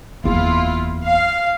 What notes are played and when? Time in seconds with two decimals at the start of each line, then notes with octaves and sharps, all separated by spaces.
0.24 F#1 E2 E3 E4 F4
1.05 F5